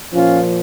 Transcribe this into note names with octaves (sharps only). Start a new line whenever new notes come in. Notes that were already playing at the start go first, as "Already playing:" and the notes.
A#2 F3 C#4 F4